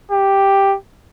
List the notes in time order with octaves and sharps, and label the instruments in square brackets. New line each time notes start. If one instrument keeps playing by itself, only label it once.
[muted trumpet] G4